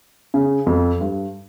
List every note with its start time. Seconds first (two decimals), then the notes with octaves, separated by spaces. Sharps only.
0.34 C#3
0.66 F2
1.01 G2